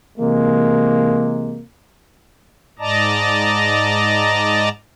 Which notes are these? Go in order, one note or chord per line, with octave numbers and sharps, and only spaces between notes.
C3 E3 G#3 A#3
G#2 D5 D#5 A5 A#5